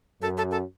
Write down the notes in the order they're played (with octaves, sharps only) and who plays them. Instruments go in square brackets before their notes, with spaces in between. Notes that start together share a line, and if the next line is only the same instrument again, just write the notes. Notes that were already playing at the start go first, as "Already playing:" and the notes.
[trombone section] F#2 [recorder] A4
[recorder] A4
A4